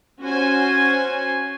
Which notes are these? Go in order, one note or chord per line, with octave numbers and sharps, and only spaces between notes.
C#4 F#4 C5 G#5